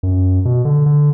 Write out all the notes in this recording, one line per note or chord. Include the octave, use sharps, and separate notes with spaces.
F#2
B2
D3
D3